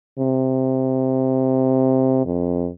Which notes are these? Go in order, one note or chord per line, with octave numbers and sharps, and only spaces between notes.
C3
F2